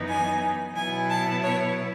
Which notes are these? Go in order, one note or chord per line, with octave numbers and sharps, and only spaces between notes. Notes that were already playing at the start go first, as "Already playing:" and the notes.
Already playing: F#2 E3 B3 D#4
G#5
B2 F#3 B3 E4 G#5
A5
C#5